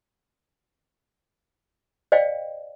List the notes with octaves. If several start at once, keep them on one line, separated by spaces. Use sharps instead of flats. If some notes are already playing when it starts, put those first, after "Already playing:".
C5 D5 D#5 F5 G5